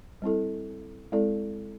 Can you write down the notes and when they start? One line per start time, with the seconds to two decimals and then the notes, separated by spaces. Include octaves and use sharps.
0.22 G3 C4 E4 A4
1.12 G#3 C4 E4 A4 D5